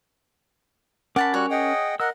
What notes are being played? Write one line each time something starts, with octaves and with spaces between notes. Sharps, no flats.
C#4 A#4 F#5 A5 B5 D6
G3 F#4 C#5 F#6
G#4 D#5 F#5 G5
A#4 D#5 F#5 E6